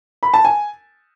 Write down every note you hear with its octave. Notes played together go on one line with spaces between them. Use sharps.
B5
A5
G#5